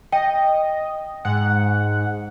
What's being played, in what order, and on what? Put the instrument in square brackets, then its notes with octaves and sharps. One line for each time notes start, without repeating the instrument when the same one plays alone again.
[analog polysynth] D#5 [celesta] G5
[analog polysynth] G#2 F#5